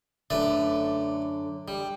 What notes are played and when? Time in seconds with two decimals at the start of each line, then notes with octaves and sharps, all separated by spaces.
0.30 F#2 D3 A3 B4 D5
1.68 G3